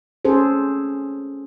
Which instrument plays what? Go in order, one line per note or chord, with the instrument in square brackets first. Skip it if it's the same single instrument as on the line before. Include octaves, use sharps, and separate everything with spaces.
[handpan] C#4 G#4 A4 C5